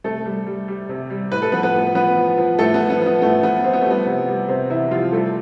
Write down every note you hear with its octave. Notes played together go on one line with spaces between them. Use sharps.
C3 A3 A4
G3
G3
G3
C3
G3
A2 B4
A4
F3 B3 B4
B3 B4
A2
F3 B3 B4
F3
F3
A2 A3 A4
B3
F3
B3
F3
B3
A2 A3
F3 B3
F3 C4
B3
A3
G3
B3
C3
G3
C3 C4
C3 E3 E4
C3 F3 F4
G3 A3 A4